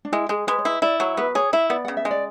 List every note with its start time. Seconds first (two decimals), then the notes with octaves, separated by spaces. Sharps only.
0.05 D4
0.12 G#3 E4
0.29 G#3 G#4
0.47 G#3 B4
0.59 C#5
0.65 E4 B4
0.82 E4 D5
1.00 F#3 C#5
1.17 B3 B4
1.35 G#4 C#5
1.53 E4 E5
1.70 B3 D5
1.85 C#3 F#5
1.97 E5
2.05 G#3
2.11 D5